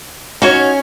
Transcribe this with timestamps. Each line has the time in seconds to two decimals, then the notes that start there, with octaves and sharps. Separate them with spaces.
0.42 C#4 D#4 F#4 C#5